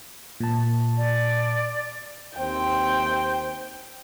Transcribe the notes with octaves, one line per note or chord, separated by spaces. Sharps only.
A#2 A5
D5
D#2 C4 C5 G5